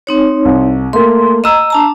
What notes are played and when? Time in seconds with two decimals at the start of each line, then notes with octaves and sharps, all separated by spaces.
0.07 C4 D#4 C#5
0.45 C2
0.93 A3 A#3 C6
1.44 D#5 A#5 E6 E7
1.70 D4 A5 A#5